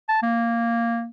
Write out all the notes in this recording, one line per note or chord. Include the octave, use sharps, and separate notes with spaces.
A5
A#3